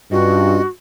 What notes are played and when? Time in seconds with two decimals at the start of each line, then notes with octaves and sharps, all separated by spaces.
0.12 G2 C#4 F4 F#4 D#5